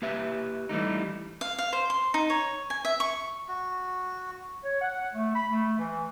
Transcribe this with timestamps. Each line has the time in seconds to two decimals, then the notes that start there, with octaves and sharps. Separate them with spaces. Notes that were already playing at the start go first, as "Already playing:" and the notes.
0.02 A#3 G4 B4 E5
0.69 E3 G3 A3 D#4
1.41 F5
1.58 F5
1.73 C5
1.90 C6
2.14 D#4
2.30 C#5
2.70 G#5
2.85 E5
3.00 C#6
3.48 F#4
4.64 C#5
4.82 F#5
5.14 A3
5.34 B5
5.51 A3
5.79 E3